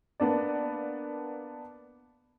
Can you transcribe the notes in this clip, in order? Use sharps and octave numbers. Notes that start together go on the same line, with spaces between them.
A#3 B3 D4 D5